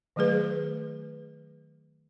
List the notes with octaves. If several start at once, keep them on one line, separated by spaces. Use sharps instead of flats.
D#3 F#3 A3 G#4 B4